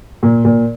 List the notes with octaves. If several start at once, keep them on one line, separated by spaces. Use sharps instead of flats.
A#2
A#2